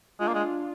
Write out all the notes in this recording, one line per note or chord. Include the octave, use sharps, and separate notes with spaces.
G#3 D4 F4
A#3
G#3